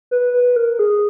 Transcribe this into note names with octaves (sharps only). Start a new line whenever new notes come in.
B4
B4
A#4
G#4